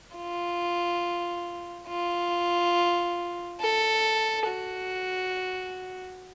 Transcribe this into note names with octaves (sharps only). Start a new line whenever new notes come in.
F4
F4
A4
F#4